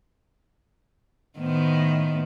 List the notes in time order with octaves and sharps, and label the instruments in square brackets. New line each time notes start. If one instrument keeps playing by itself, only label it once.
[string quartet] A2 C5 [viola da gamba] D#3 B3